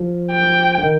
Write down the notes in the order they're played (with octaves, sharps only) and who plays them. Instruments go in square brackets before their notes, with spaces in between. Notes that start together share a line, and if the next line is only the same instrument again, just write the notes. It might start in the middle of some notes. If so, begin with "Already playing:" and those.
Already playing: [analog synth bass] F3
[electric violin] G5
[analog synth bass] D3
D#3